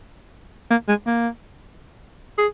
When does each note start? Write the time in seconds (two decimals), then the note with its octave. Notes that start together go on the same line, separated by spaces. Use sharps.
0.70 A#3
0.88 G#3
1.06 A#3
2.38 G#4